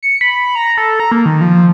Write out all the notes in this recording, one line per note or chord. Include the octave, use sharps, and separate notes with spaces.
C#7
B5
A#5
A4
A#5
A#3
D#3
F3